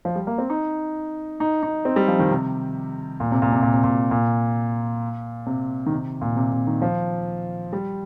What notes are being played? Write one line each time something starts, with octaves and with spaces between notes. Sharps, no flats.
F3
G3
A#3
C4
D#4
D#4
D#4
C4
G3
F3
D#3
C3
A#2
C3
A#2
C3
A#2
C3
A#2
A#2
C3
D#3
C3
A#2
C3
C3
D#3
F3
G3